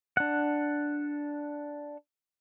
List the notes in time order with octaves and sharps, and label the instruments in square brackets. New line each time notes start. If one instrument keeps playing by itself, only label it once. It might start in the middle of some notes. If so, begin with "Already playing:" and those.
[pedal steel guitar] D4 F#5